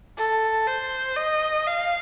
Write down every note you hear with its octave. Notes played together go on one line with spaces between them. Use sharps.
A4
C5
D#5
F5